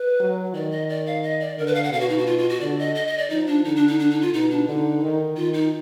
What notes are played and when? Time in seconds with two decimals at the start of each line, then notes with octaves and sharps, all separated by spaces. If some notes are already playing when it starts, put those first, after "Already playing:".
Already playing: B4
0.20 F#3
0.54 D#3 D5
0.71 D#5
0.89 D5
1.07 F5
1.23 D#5
1.40 D5
1.58 D3 A#4
1.67 B4
1.75 F5
1.84 F#5
1.92 B2 F5
2.01 F#4
2.09 D#4
2.18 F#4
2.27 F4
2.38 F4
2.50 F#4
2.61 D3 D5
2.79 D#5
2.95 D#5
3.07 D#5
3.18 D5
3.30 F3 D#4
3.47 D4
3.65 D3 D#4
3.76 D4
3.88 D#4
4.00 D4
4.11 D#4
4.22 F4
4.34 B2 D#4
4.51 D4
4.67 D3 D#4
5.03 D#3
5.36 D#3 F4
5.54 D#4